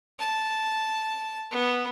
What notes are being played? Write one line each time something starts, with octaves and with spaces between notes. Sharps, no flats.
A5
B3